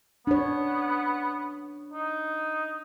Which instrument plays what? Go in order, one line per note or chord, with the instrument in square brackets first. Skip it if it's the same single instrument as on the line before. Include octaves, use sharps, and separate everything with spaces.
[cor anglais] B3 [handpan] D4 C#5
[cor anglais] D#4